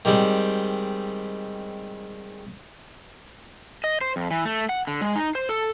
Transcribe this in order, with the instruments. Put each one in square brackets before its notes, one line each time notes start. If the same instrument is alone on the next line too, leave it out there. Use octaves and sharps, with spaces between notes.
[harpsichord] D#3 G3 G#3 C4
[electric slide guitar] D#5
C5
F2
E3
A3
F#5
D3
G#3
D#4
C5
A4